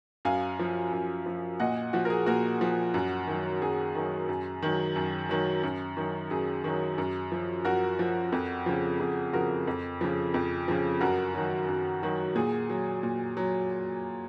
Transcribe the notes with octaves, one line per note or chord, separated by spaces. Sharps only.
F#2 F5 G#5
F3
F#2
F3
A#2 D#5 F#5
F3 F#4
A#4
G#4
A#2 F#4 A#4
F3
F#2
D#3 F#3
F#2 G#4
D#3 F#3
F#2
D#3 F#3
F#2
D#3 F#3
F#2
D#3 F#3
F#2 G#4
D#3 F#3
F#2
F3
F#2 F#4 A#4
F3
F2
C#3 F3
F2 G#4
C#3 F3 F#4 A#4
F2
C#3 F3
F2
C#3 F3
F#2 F#4 A#4
D#3 F#3
F#2
D#3 F#3
A#2 G#4
F#3
A#2
F#3